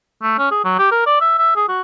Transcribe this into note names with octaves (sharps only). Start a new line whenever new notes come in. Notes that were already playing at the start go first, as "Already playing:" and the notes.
A3
C#4
G#4
F#3
G4
A#4
D5
E5
E5
G#4
F#4